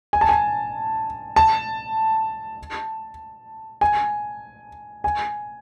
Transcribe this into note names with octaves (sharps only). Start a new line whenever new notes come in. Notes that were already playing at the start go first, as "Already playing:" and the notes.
G#5
A5
G#5
A5
G#5
G#5